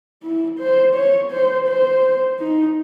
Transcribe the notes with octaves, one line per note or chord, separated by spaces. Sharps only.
E4
C5
C#5
C5
C5
D#4